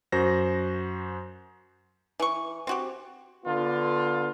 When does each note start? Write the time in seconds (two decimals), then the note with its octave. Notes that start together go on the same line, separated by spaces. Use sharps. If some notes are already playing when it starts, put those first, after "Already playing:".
0.12 F#2 F#4 C5 A#6
2.20 E3 C#6
2.67 C4 F#4 G4
3.45 D3 B3 F4